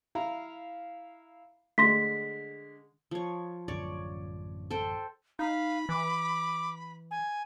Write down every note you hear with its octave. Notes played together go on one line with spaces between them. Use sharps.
E4 F5 A#5
D3 G#3 A3 C6 A#6 B6
F3 C#5
A1 F#2 D3 C#5 D5
A4 C5 G5
D#4 F5 B5
E3 D6
G#5